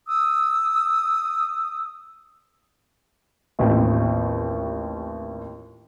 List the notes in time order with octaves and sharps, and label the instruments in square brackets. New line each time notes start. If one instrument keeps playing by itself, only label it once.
[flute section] D#6 E6
[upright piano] A1 D#2 C4 F4 G5